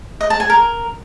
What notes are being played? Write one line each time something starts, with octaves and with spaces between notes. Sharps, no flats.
D#5
A5
G#5
A#4